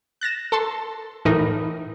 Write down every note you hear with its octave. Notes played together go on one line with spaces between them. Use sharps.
F#6 A6 A#6 E7
A4 A5 C6
A2 E3 D#4 A#4